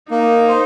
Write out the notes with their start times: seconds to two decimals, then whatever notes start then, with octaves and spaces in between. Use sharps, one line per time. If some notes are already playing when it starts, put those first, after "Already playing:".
0.11 A#3 D#4
0.48 C5